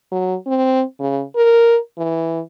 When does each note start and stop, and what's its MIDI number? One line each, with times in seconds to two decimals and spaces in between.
0.12 0.35 54
0.47 0.83 60
1.00 1.22 49
1.36 1.78 70
1.98 2.41 52